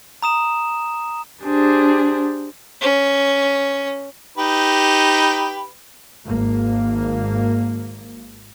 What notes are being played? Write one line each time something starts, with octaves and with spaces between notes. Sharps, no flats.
A#5 D#6 E7
D4 G4 G#4 C5
C#4
D#4 G4 B4
G#1 A#3